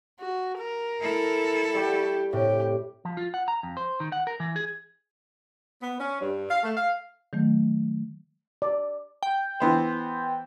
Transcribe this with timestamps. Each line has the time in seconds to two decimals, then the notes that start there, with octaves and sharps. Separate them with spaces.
0.20 F#4
0.58 A#4
1.00 E4 A4
1.74 G3 G4 C#5 G5
2.33 A2 C3 G4
3.05 F3
3.17 F4
3.34 F#5
3.48 A#5
3.63 F2
3.77 C5
4.00 D#3
4.12 F#5
4.27 A#4
4.40 E3
4.56 G#4
5.82 B3
5.99 C#4
6.21 G2
6.50 F5
6.63 A3
6.76 F5
7.33 D#3 F#3 A3
8.62 D5
9.23 G5
9.60 E3 B3 C5